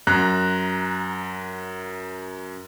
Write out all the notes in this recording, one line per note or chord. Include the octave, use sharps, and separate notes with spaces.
F#2 A#5 F#6